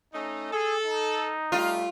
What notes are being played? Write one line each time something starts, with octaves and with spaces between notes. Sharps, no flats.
A3 C#4 D#4
G#4 A4
D#4
G3 A3 F4